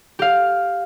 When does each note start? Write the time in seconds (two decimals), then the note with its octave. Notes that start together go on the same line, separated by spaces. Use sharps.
0.19 G4 F5